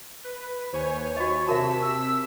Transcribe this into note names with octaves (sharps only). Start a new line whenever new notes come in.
B4
D#2 C5 C#5 G#5
F#4 D#5 C#6
C3 F#4 A#4 E5 A5 B6 E7
E6